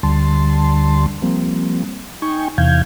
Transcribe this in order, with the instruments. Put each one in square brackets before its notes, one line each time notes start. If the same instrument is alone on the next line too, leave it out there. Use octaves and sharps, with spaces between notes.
[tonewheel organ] D2 D3 G3 A5 C6
F3 G3 A#3 C4
D#4 G5 G#5 C#6
E2 C3 E3 F5 G6 G#6